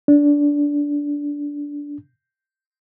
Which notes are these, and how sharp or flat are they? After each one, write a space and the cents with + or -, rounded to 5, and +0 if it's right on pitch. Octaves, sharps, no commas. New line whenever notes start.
D4 -15